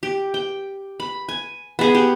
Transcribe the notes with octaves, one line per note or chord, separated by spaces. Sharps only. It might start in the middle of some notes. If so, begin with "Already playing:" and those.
G4
G5
B5
G#5
B3 G#4
G4